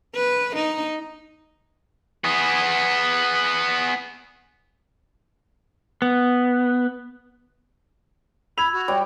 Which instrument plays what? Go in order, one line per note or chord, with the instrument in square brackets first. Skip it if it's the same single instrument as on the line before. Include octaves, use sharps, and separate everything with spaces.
[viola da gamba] B4
D#4
[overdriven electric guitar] B3 G#4
[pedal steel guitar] B3
[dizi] B5 [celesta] E6 G#6 [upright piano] F7
[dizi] F#4
[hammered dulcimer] G3 [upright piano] C#5